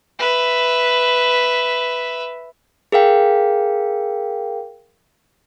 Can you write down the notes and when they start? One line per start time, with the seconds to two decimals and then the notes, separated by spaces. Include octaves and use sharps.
0.19 B4 E5
2.92 G#4 A#4 F5 G5